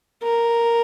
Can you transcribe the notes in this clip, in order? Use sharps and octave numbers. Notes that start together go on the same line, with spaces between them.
A#4